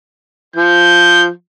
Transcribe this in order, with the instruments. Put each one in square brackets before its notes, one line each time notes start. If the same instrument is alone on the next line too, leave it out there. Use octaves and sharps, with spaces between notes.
[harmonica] F3 [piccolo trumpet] G6